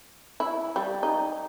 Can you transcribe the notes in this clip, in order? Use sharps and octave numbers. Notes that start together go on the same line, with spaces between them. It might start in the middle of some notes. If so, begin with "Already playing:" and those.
E4
G3
D#4